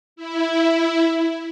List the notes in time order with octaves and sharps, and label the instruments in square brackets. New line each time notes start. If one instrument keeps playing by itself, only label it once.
[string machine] E4